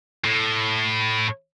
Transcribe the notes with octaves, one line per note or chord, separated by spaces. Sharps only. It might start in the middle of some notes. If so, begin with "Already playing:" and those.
A2